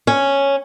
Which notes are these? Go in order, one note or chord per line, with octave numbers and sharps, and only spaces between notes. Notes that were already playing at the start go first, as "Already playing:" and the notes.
C#4